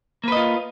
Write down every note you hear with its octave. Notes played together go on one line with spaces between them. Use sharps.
A#3 F4 B4 D#5